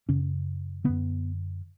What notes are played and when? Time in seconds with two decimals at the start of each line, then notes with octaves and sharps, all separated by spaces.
0.09 F#2 C#3 C#4
0.84 F#2 D3 B3